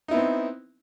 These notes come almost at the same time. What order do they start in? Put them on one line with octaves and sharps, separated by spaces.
D#4 E4 B3 C4